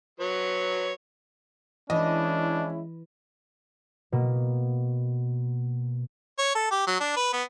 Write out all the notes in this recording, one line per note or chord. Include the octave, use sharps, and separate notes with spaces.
F#3 B4 C#5
E3 G#3 C#4 D4 E4 D#5
B2 A#3
C#5
A4
G4
F#3
D4
B4
B3